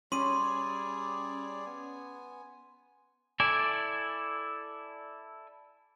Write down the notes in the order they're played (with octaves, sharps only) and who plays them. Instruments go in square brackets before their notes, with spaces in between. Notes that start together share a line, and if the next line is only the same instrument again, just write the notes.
[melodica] G3 G#4 D5 [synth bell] C#4 [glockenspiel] C6 D#7
[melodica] B3 G#5
[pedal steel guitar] E4 A4 D5 G#5